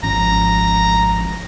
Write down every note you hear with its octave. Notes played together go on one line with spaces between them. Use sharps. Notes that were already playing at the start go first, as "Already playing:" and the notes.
G#1 F3 C#4 A#5